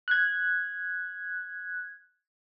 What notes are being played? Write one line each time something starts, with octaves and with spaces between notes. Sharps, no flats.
F#6 G#6